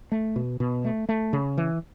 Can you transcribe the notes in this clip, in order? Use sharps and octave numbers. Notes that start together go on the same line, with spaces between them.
A3
B2
B2
A3
A3
C#3
E3